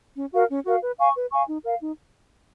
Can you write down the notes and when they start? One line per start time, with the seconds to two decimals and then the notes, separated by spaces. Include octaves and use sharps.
0.16 C#4
0.32 F#4 A#4 F5
0.49 C#4
0.65 F#4 A#4 F5
0.81 B4
0.98 F5 G#5 C#6
1.15 B4
1.31 F5 G#5 C#6
1.48 D#4
1.65 A#4 F5
1.82 D#4